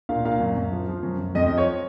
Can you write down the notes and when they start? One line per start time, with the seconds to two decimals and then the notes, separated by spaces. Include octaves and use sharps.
0.09 A#2 F5
0.25 A#2 F5
0.40 F#2
0.57 F#2
0.72 F3
0.88 F3
1.03 F#2
1.18 F#2
1.35 F2 D#5
1.46 F3 D#5
1.58 C#5